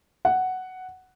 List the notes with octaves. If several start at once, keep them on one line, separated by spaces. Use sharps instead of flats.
F#5